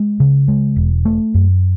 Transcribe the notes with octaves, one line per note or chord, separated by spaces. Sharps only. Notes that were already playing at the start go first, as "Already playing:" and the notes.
Already playing: G#3
C#3
G#3
E1
A3
F#2